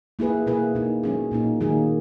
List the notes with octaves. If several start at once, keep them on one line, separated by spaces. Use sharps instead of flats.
A#3 E4 G#4 B4
B2 A#3 E4 G#4 B4
B2 A#3 D#4
F#3 C#4 G#4
A#2 A#3 D#4
D#3 F#3 A#3 D#4 G#4